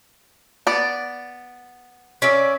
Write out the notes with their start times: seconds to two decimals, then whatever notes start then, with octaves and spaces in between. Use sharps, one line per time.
0.67 B3 D5
2.22 C#4 D5 E5